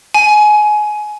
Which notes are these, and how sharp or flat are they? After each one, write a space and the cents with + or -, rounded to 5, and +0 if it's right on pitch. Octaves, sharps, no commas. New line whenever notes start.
G#5 +20